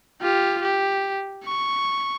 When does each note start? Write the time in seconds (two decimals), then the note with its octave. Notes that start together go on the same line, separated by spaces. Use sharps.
0.21 F4 G4
0.62 G4
1.45 C#6